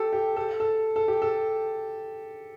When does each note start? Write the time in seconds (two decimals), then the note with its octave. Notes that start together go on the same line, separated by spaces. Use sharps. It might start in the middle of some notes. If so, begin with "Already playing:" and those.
Already playing: G4 A4
0.13 G4
0.36 A4
0.60 A4
0.96 A4
1.08 G4
1.22 A4